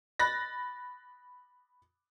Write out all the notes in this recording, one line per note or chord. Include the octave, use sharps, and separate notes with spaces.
B5 F#6 A6 A#6